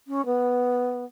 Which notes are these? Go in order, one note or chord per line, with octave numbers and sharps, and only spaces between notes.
C#4
B3